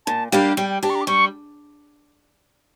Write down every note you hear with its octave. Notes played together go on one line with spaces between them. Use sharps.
A#2 A5
G3 A#3 D4 G4 F5
G3 G5
G5
D4 G4 A5
C#6
A#5
D6
G3 C#6